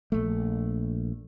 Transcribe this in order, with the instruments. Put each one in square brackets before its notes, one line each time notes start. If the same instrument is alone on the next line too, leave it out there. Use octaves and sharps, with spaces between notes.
[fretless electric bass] A#1 A3